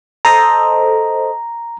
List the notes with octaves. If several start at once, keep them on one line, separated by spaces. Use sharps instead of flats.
A4 C5 D#5 A#5